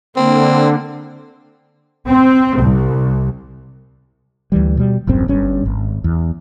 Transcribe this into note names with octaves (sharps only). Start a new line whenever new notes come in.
D3 A#3 C4
C4
C2
D2 E3 G3
B2 G3
D#1 A1 F#2 C4
G1 G2 C#4
G#1
E2